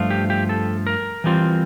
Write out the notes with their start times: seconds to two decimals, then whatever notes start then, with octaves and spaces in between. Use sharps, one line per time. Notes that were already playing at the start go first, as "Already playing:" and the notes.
Already playing: G2 F3 A3 F4
0.11 G4
0.30 G4
0.49 A4
0.87 A#4
1.24 E3 G3 C4 F4